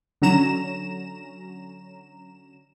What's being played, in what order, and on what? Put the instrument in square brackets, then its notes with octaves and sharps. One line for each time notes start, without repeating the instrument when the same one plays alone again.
[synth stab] D3 F#3 C#4 A#5 E7